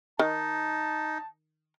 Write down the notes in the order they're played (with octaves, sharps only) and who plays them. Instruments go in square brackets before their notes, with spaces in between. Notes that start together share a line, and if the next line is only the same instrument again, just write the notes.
[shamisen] D#3 [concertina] D#4 [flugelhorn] A5